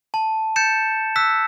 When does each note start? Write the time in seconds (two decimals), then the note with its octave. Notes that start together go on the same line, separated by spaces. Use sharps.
0.14 A5
0.56 G6 A6 C#7 E7
1.16 E6 F#6 B6